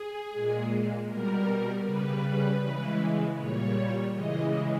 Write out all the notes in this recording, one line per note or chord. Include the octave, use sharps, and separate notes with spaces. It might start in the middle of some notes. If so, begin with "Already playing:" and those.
Already playing: G#4
A#2 G#3
B2 G3 A#4
C#3 G3 B4
C#3 E3 G#3
A#2 G3 C#5
C#3 E3 G#3 D#5